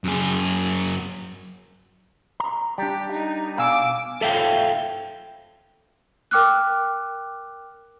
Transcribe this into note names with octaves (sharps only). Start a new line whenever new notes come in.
F#2 G#4
A#5
G3 D4 G4
D#4
B2 F5 G#5 D6 E6
A4 E5 F5 G5
A#4 G5 D6 F6 F#6